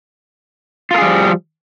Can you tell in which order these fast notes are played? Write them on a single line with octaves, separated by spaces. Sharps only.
F4 A#4 G#4 G3 F3